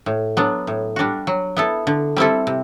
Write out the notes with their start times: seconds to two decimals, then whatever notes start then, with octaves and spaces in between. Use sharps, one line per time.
0.06 A2
0.37 F#3 B3 D4
0.67 A2
0.96 G3 D4 F#4
1.27 F#3
1.57 B3 E4 A4
1.87 D3
2.16 G3 C4 E4 A4
2.47 C3